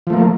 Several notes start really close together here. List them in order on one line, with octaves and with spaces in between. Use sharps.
F3 A3 A#3